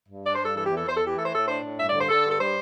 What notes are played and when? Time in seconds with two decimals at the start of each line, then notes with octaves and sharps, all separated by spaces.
0.09 G2
0.24 D4 D5
0.34 C5
0.40 G2 A4
0.55 E3 A4
0.65 G4
0.70 E2
0.76 A4
0.85 E2 C5
0.96 A4
1.02 E3
1.07 G4
1.17 A3 A4
1.25 C5
1.33 A2 A4
1.47 D4 C5
1.62 A2
1.78 G2 E5
1.89 D5
1.94 D3
1.99 C5
2.09 D3 A4
2.25 G2 A4
2.39 G3 C5